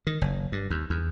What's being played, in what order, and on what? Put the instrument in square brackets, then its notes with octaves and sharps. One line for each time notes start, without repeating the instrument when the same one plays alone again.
[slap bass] D#3
F#1
G2
D#2
E2